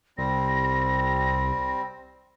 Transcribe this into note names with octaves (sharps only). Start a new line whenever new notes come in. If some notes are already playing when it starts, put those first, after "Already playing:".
C2 G3 C4 A#6